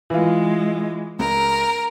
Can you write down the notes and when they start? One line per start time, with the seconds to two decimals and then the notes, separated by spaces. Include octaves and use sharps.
0.10 E3 G#3 F4
1.19 C#2 A#4